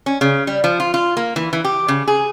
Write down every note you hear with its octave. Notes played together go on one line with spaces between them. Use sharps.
C#4
C#3
G3
F3
F4
F4
A#3
E3
E3
G4
C#3
G#4